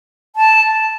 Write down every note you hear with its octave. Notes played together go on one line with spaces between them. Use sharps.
A5